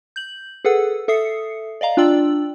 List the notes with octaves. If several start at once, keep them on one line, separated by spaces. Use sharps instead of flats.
G6 F#7
G#4 A4 B4 F#5 E6
A4 E5 D#6 C7 C#7
D5 D#5 F5 A#5
D4 F4 D5 G5 E6 F#7